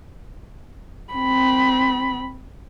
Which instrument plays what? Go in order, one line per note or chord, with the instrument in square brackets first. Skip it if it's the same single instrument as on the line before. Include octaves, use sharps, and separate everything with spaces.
[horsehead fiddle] C4 B5